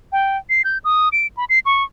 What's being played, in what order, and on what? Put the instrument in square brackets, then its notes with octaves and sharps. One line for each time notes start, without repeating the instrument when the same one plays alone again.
[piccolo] G5
C7
G6
D#6
D7
B5
C7
C#6